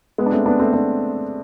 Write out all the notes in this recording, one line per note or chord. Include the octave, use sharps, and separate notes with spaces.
G#3 B3
D4
A3 C4
B3 D4
A3 C4
B3 D4